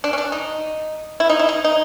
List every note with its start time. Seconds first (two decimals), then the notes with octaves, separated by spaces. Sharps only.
0.04 D4
0.13 C#4
0.18 D4
0.32 D#4
1.20 E4
1.30 D#4
1.39 E4
1.49 D#4
1.64 D#4